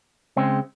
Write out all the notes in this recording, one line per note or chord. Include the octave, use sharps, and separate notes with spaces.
C#3 G#3 C4